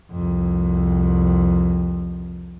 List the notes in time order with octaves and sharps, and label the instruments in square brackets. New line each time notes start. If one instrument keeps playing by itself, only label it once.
[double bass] C2 F2